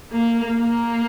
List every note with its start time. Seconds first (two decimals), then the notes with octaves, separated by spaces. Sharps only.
0.12 A#3
0.58 A#3